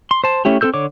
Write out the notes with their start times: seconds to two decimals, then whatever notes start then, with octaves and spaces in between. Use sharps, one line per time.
0.11 C6
0.24 C5 A5
0.45 A3 C#4 E4 G4
0.61 C4 F#4 A4 E6 G6
0.74 D3 C#5 D6